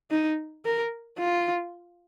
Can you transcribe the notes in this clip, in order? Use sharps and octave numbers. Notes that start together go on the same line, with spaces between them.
D#4
A#4
F4